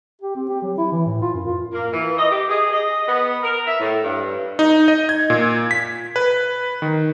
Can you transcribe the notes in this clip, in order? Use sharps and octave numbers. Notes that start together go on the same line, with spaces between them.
G4
C4
G4
F#3
E4
E3
A2
F4
F#2
F4
A#3
E3
D#5
G4
G#4
D#5
B3
A#4
E5
A2
G2
D#4
D#5
G#6
A#2
B6
B4
D#3